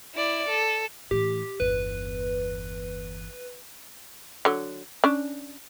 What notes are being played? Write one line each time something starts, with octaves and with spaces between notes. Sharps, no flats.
E4 D5
A4
A2 E3 G4
G1 E2 B4
D3 F#3
C#4 D4